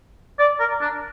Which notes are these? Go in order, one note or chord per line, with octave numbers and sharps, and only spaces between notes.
D5
A#4
D4